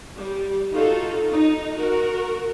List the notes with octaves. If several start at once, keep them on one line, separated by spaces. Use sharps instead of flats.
G3
D#4 F4 F#4 A4
D#4
F#4 A#4